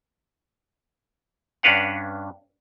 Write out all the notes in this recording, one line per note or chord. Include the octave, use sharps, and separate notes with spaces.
G2 C#4 D4 B4 F5 F#5